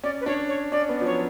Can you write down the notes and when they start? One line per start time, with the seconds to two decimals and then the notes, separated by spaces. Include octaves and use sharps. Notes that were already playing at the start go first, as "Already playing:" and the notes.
0.03 C#4 D5
0.21 B4
0.26 D4 C#5
0.48 C#5
0.72 C#4 D5
0.89 B3
1.01 F3
1.06 F#3 C#5